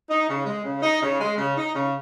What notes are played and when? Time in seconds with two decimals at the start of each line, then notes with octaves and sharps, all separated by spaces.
0.09 D#4
0.27 C#3
0.46 G#3
0.63 C#3
0.82 D#4
1.00 C#3
1.19 G#3
1.37 C#3
1.56 D#4
1.74 C#3